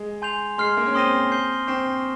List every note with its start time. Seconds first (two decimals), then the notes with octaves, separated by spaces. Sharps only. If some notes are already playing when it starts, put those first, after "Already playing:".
Already playing: G#3
0.22 G#5 C6 G6 C7 F7
0.58 G#3 C6 F6 C7
0.77 A#3
0.87 C#4
0.94 C4 C6 D#6 A#6 D#7 G7
1.32 G6 C7 G7
1.67 C4 C#6 G6 C7